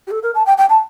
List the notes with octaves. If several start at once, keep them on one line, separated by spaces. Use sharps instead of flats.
G4
A4
A#4
A5
G5
G5
A5